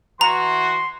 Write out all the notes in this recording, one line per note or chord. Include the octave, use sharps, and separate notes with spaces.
E3 F#4 A#5 C6